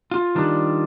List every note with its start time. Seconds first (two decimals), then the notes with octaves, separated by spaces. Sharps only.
0.11 F4
0.35 D#3 G3 D4